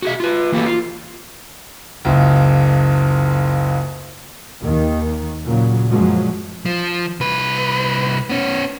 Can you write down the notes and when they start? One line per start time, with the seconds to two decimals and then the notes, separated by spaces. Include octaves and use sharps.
0.02 F#4 G#4 E5
0.20 F4 B4
0.52 E3 A#3 F#4 G4 A4
0.67 F4
2.05 F#1 C#2
4.62 D#2 D#3
5.45 A#2 C#3 F#3
5.90 F#2 A#2 F3 F#3 G#3
6.66 F3
7.20 C2 B4
8.30 B3 C#4